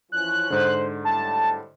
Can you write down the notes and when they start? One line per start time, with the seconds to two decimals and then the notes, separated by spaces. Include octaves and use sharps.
0.12 E3 F3 C#4 F#6
0.50 G#2 D3 C5
1.05 A2 G3 A5